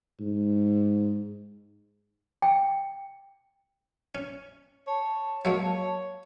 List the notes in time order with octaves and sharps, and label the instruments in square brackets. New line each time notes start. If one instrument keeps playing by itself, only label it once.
[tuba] G#2
[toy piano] G5
[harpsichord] C#4
[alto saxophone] C#5 [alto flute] A5
[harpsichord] F#3 G#3 A#3 [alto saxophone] C#5